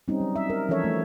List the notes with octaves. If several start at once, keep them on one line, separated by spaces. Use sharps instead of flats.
G3 C4 C#4 D#4
F#3
E5
A#4
E3 F3 C#4 A4 C#5 E5
A3